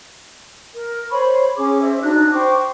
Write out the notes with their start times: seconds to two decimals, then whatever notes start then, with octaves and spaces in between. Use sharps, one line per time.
0.73 A#4
1.11 C5 C#5 B5 C#6
1.56 C#4 G#4 D6
1.80 C5 D#5 E5
2.02 D4 D#4 F#4 F#6
2.31 C5 G5 C#6 D6